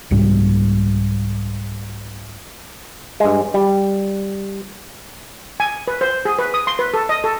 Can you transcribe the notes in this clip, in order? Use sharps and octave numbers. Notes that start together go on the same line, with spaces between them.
C2 G#2 G3
G2 G#3
G3
G#5
B4
C5
G#4
B4
D#6
C6
B4
A4
D#5
A4